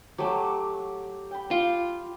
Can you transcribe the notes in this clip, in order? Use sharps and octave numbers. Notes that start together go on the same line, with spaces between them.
F#3 A3 G4 D6
G5 B5
F4